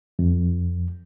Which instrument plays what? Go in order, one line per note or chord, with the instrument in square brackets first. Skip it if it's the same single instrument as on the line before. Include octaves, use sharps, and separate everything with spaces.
[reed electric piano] F2